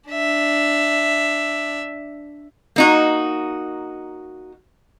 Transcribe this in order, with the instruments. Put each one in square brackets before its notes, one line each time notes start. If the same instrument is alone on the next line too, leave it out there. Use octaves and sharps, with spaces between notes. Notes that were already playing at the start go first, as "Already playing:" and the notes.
[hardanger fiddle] D4 E5
[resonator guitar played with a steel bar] A#3 D#4 F#4